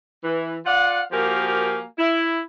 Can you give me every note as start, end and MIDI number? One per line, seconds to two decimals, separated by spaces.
0.23 0.55 52
0.66 1.01 65
0.66 1.01 74
0.66 1.01 77
0.66 1.01 78
1.12 1.83 53
1.12 1.83 58
1.12 1.83 66
1.12 1.83 67
1.12 1.83 70
1.12 1.83 80
1.98 2.39 64